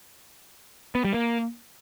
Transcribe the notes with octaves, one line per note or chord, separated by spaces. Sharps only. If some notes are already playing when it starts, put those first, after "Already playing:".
B3
G3
A#3